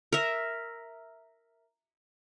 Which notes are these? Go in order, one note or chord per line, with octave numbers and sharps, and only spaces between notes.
A#4 E5